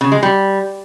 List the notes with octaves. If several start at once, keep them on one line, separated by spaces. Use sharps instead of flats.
C#3
G#3
G3